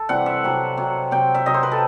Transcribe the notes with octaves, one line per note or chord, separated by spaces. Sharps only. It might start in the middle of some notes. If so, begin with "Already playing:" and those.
Already playing: A4
C3 E3 G3 C4 F#5
E5
C3 F#3 C4
C3 F#3 C4
C3 F#3 C4 G5
E5
C3 F#3 C4 D#5
C5
B4
A4